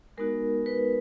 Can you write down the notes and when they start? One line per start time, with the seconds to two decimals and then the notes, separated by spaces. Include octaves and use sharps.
0.17 G#3 B3 D#4 F#4 A#4
0.66 B4